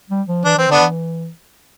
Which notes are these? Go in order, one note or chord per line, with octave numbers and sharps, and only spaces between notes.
G3
F3
E3 D4
E3 C4
D3 B3 D4
E3